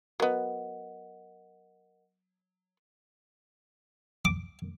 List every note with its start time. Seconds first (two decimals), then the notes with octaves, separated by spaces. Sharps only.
0.20 F#3 B3 A#4 D#5 F#5
4.25 D6